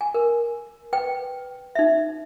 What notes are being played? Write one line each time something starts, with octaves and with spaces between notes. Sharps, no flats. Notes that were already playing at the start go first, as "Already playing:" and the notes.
G#5
A#4
B4 G5
D#4 E5